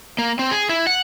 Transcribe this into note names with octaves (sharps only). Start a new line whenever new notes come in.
A#3
C4
G#4
E4
F#5